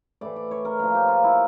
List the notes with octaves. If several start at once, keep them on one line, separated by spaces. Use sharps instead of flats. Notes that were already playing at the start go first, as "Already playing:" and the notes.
A2 E3 D5
D5
C#5
A#4
A#2 F3 A#4
G4
F4
E4